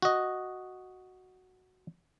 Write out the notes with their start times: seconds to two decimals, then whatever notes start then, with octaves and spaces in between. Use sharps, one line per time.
0.02 F#4 D#5